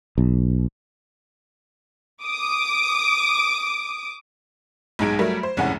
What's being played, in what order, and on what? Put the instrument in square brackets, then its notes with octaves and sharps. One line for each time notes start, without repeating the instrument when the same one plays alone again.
[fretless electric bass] B1
[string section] D6 D#6
[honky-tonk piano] B1 G#2 G#3 D#4 G#6 D7
F#3 G3 A3 A#4
C5
F1 C2 G#2 C#3 C#4 F#5